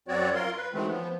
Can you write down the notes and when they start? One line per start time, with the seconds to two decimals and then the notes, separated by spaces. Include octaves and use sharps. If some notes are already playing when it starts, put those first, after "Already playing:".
0.08 F#2 F#3 C4 F#4 C#5 D5
0.34 F4 A#4 C6
0.57 B4
0.73 D#3 E3 F#3 G#3 A3 C4
0.90 F3 B3